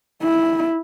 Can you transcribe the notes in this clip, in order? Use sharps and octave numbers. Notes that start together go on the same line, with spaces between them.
E4